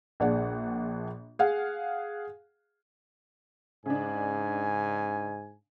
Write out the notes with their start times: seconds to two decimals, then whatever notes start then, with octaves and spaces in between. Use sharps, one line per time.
0.20 A#1 D4 G#4 D5 F#5
1.39 G#4 F5 F#5
3.86 G#2 C#3 D4 G#5